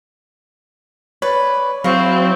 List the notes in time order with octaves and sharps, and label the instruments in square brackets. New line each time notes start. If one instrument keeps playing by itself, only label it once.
[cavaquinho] B4 D5 [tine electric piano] C#5
[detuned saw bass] F#3 [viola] C4 E4 [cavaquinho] F5 C#6